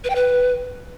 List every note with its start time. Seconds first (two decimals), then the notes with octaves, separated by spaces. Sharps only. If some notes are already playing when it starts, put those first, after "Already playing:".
0.04 B4
0.10 G5
0.15 B4